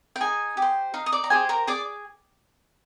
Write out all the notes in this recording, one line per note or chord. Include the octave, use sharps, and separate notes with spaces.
G5
D#4 G#4 G#5
G4
C5
D#4 F5
D#6
D5 D6
A#5
G4 G#4 C5 G#5
A#4 A#5
G#4 D5 D6